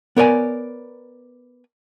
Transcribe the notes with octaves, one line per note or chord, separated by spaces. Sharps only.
B3 A#4 C#5 D5 G#5